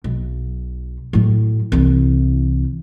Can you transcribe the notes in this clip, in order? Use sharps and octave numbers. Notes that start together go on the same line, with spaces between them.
B1
A2 F#3
C2 E3